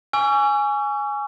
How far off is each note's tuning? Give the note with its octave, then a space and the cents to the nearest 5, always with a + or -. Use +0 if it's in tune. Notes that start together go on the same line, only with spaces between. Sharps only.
G#5 +0 C#6 +35 E6 +45